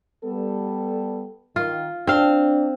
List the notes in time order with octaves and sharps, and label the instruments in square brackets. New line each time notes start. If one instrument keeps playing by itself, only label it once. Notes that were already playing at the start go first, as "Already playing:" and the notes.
[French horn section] G3 B3 A4
[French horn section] D#3 [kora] F4
[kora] C4 F5 [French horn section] D4